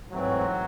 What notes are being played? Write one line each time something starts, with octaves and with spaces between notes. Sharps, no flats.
G#2 E3 F#3 A3 C4